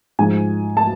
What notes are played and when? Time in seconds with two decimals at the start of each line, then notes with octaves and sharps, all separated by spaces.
0.19 G#2 F3 G#3 G#5
0.77 A5